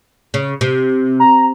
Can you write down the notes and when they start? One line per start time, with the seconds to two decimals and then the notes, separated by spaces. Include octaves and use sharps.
0.34 C#3
0.61 C3
1.20 A#5